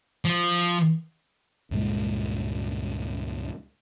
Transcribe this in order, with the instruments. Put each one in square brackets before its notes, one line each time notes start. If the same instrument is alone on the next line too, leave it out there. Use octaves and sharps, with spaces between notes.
[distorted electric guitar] F3
[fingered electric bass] C#2 G2 A#2 G#3